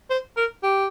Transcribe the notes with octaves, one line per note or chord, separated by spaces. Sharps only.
C5
A#4
G4